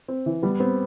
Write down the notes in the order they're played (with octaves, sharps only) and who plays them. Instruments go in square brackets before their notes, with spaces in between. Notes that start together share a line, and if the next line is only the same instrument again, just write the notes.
[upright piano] C4
E3
[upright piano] G3 [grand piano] B3
[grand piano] B3 [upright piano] C4